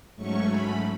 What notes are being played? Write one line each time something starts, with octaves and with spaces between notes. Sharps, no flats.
G#2 F#3 A3 C#4 C#6
B5